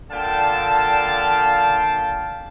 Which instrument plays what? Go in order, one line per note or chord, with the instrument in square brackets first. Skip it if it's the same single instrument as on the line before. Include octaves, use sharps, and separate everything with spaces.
[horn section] A#2 D3 F5 G5 A5